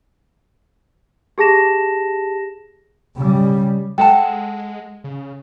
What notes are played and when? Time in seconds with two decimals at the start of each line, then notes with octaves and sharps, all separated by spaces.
1.38 G4 G#4 A5 A#6 E7
3.17 C#3 G3
3.98 G#3 A4 F#5 G5 A5
5.04 C#3